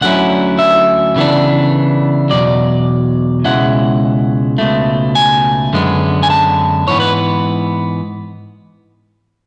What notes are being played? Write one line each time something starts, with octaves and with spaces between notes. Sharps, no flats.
D2 D3 F#3 C#4 E4 F#5
E5
C#3 E3 B3 D4
E2 B2 F#3 D5
C#2 B2 G#3 C#4 E4 F#5
C#2 B2 A3
G#5
F#2 D3 G#3 B3
G#5
A5
G#2 E3 B3 C#5
B4